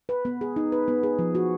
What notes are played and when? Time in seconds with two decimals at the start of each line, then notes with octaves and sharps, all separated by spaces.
0.09 B4
0.25 B3
0.41 G#4
0.56 D#4
0.72 B4
0.88 B3
1.03 G#4
1.19 F3
1.35 F#4